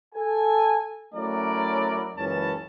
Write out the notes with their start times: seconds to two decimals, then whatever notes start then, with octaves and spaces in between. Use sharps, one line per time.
0.15 A4 G#5
1.14 F#3 A3 C#4 E4 A#4 D5
2.17 F#1 C#2 F#2 E3 C#4 A5